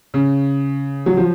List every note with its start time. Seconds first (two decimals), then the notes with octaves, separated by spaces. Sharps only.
0.14 C#3
1.06 F#3
1.17 F3